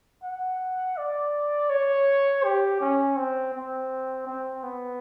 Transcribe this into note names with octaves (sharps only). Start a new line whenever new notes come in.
F#5
D5
C#5
G4
C#4
C4
C4
C4
B3